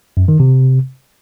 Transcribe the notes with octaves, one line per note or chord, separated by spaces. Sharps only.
F#2
D#3
C3